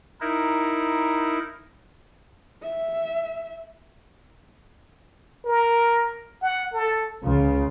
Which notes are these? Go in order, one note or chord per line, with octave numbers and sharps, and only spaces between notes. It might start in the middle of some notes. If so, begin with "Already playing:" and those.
D#4 E4 A#4
E5
A#4
F#5
A4
C#2 C#3 F4